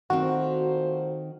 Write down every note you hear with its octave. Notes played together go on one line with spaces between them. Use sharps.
A#2 D#3 A3 C4 F#4 C5